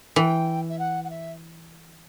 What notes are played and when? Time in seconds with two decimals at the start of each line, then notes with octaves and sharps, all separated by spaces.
0.16 E3 G5
0.69 E5
0.79 F#5
1.04 F#5
1.10 E5